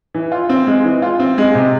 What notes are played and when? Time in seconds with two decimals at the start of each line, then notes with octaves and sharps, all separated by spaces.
0.14 E3
0.32 F4
0.49 C4
0.67 G#3
0.84 E3
1.02 F4
1.20 C4
1.38 G#3
1.55 C3